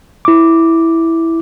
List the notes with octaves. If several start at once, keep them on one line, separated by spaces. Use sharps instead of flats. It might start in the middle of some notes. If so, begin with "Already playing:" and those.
E4 D6